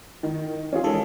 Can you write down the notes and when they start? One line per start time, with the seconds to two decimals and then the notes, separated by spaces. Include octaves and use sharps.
0.23 D#3
0.73 E3 C#4 F4 G#4
0.84 D#3 G#3 A4